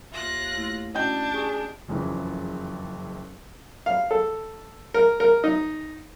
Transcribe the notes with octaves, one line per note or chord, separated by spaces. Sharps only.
D#2 F4 E5 F#6 A#6
A3 A#3 E4
C#4 D4 E4 F#4 D#5 G5 G6
G4 G#4 C#6
F#1 F2 C#3 E3
F5
A4
A#4
A#4
D#4